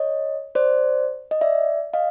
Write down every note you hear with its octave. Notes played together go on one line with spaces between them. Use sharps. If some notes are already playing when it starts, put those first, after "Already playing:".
Already playing: C#5 D#5
C5 D5
D#5
D5 E5
D#5 F5